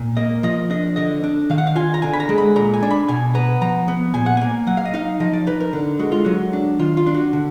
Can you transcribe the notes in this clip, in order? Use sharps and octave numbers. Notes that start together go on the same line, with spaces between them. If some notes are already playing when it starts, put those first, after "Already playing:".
Already playing: A#2
A#3 D#5
F3 D#5
D4 D#5
D3 D#5
D4
D#3 F5
F#5
F5
F4 G#5
A#5
D3 G#5
B5
A#5
G#3
B5
A#2 A#5
G#5
D4
B5
B2 G#5
B3 A#5
F3 A#5
B3
A#2 G#5
F#5
A#3 G#5
F#3 F#5
F5
D#5
D#4 F5
F3 D#5
D5
D#4 B4
A#4
D3
G#3 F#4
F4
F#3 F#4
D4
D#3 F4
F4
D4
F#4
D3